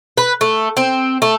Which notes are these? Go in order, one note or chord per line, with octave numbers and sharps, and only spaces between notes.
B4
A3
C4
A3